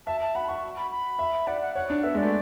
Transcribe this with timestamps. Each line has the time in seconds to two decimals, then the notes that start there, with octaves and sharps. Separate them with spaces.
0.07 E5 A5
0.21 A5
0.35 F#5 B5
0.48 F#5 C#6
0.77 B5
0.91 B5
1.19 E5
1.47 D5 F#5
1.62 F#5
1.75 C#5 F#5
1.90 D4
2.03 B3 E5
2.14 G#3 D5
2.22 A3